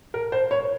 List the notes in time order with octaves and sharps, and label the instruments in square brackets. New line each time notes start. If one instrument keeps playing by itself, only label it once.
[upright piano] A#4
C5
C#5